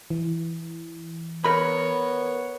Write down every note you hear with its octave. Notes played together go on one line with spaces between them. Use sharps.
E3
B3 A#4 C#5 B5